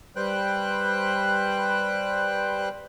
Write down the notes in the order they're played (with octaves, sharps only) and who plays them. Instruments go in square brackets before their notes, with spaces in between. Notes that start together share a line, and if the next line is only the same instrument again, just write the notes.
[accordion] G3 B4 C5 G5 F#6